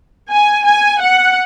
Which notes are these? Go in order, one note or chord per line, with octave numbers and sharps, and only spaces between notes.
G#5
G#5
F#5